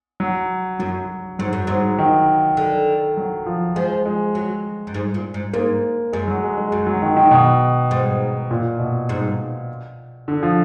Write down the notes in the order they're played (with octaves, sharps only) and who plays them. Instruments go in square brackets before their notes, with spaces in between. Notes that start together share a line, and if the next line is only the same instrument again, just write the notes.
[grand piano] F#3
[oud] F#2 [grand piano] F#3
[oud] G#2 [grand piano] F#3
[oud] F#2
[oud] G#2 [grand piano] F#3
[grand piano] D#3
[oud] D3
[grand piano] F#3
F3
[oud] F3 [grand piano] G#3
[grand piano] G#3
[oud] F#3
F#2
G#2
A#2
G#2
[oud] G#2 [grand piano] A#3
[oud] F#2 [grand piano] G#3
[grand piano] F#3
G#3
G#3
[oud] F#2
[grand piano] F#3
D#3
D#3
B2
[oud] G#2
[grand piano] A#2
B2
[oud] G#2
[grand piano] D3
F3